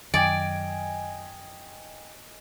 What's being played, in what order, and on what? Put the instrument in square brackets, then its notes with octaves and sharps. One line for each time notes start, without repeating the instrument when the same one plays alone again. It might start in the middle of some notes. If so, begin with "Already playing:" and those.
[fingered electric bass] F#2 D#3 [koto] D5 [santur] D#5 G#5 [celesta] G5 G#6 D7